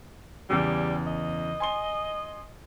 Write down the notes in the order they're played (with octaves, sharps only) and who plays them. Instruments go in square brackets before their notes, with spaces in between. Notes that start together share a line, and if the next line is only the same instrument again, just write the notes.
[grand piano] E2 C#3 [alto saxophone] G3
[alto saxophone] D#5
[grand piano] G#5 C6 G7